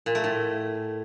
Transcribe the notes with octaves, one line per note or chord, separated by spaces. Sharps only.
A#2
A3
A2